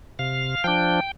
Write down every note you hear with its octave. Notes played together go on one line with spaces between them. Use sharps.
C3 F5
F3 D4 G5